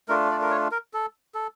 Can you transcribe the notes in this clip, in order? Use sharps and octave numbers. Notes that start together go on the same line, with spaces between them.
A3 D4 F4 A#4
D5
A#4
C#5
A#4
A4
A4